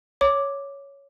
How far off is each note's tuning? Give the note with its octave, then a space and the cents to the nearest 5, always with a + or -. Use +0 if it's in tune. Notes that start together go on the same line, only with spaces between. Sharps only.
C#5 +5 D6 +0